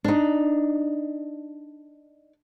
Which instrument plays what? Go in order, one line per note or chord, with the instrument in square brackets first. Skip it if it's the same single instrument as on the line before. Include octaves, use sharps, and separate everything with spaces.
[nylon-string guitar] D4 D#4